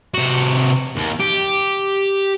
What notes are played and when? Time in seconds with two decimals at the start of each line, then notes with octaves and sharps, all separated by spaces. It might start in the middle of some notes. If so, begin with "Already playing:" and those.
0.14 C3 F#4
0.95 D#2
1.19 G4